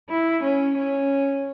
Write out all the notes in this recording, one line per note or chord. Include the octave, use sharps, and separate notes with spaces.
E4
C#4
C#4